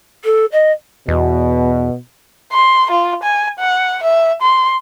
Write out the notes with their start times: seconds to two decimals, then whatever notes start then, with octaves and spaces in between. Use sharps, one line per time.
0.24 A4
0.52 D#5
1.08 E2 B2
2.52 C6
2.91 F4
3.23 G#5
3.59 F#5
4.03 E5
4.42 C6